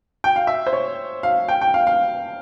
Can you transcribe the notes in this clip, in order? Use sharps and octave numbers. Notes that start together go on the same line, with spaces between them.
G5
F5
E5
C5
C#5
F5
G5
G5
F5
F5